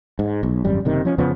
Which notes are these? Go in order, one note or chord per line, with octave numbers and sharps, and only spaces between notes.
G#2
B1
G#1 F#2 G3
F#1 C3 D#3
F3 C#4
F2 C#3 F3 B3